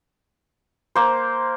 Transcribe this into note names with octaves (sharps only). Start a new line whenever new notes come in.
A#3 C5